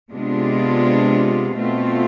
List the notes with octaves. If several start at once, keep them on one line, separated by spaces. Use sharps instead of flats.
C3 G#3 B3 D4 F4
B2 A3 C4 F4